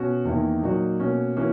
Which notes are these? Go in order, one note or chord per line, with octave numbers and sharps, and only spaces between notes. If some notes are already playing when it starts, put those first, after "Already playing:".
Already playing: B2 C#4 F#4
E2 D#3 A#3 E4
A#2 F#3 A#3 D#4 F#4
B2 A#3 C#4 F#4
E3 A#3 C#4 F#4